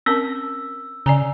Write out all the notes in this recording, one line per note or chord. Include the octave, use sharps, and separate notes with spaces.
C4 C#4 A#4 E6
C#3 D5 G#5 A#5